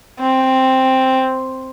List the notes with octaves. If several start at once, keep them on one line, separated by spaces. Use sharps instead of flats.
C4